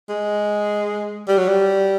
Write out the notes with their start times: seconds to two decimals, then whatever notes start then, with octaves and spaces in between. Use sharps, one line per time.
0.09 G#3
1.28 G3
1.38 F#3
1.48 G3